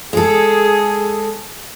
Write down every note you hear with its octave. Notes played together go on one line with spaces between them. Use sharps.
G#3 G#4 A4